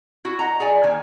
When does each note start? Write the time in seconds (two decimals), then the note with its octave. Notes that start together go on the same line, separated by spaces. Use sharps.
0.25 E4 F#4
0.39 D#5 F#5 A#5
0.60 G#4 D5 G#5
0.83 D#3 A#3 G#5